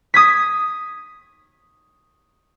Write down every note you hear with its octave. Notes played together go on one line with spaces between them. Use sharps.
D#6 G#6 B6